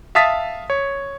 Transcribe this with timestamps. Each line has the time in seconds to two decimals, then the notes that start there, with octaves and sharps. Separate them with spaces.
0.15 E5 F5 A5 D#6 A6 B6
0.70 C#5